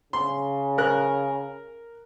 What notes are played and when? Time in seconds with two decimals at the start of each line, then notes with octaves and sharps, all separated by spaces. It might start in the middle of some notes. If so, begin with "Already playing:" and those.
0.13 C#3 C6
0.78 A#4 F#6